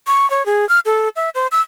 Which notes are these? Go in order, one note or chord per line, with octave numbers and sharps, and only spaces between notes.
C#6
C#5
G#4
F6
A4
E5
C5
E6